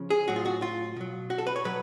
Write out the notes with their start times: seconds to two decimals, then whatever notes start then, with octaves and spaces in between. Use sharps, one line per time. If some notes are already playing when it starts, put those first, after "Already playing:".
Already playing: C#3 F3
0.10 G#4
0.28 A2 F#3 F#4
0.36 F4
0.46 F#4
0.62 F4
0.96 B2 F#3
1.30 F#4
1.38 A4
1.47 B4
1.56 C#5
1.64 B2 F#3 B4